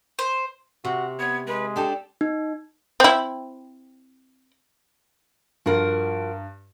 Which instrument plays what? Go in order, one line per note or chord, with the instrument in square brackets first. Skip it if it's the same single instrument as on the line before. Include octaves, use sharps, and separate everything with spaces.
[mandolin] C5
[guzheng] C3 [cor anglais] F#4
[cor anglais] B3 [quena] G#6
[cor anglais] G#3 [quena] B4
[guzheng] D4 G4 [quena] A4
[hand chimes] D#4
[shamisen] C4 E4
[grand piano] G2 [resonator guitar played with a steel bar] F3 F#4 A#4